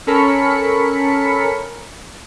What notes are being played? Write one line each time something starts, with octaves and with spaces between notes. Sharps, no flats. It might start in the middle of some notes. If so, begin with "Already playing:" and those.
C#4 A4 A#4 B5 B6 C#7